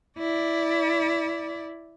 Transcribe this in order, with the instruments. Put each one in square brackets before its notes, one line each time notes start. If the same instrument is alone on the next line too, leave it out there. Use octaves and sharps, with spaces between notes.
[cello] E4 D5